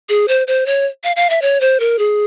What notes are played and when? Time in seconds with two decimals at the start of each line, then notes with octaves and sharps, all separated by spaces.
0.09 G#4
0.28 C5
0.47 C5
0.66 C#5
1.04 F5
1.16 F5
1.30 E5
1.42 C#5
1.61 C5
1.80 A#4
1.99 G#4